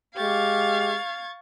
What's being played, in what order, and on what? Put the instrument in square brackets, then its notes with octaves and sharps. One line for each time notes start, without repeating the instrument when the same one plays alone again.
[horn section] G#3 G4 [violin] F5 [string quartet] C#6 G#6 A6